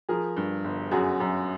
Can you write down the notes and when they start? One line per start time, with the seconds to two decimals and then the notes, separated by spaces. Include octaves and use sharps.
0.09 F3 G#4 A#4
0.37 G2
0.64 G1
0.91 F#2 F#4 G#4
1.20 F#2